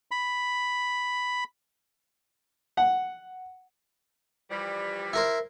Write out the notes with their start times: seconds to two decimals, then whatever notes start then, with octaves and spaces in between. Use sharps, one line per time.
0.11 B5
2.77 F#5
4.50 E3 F3 G3
5.13 E4 A#4 C5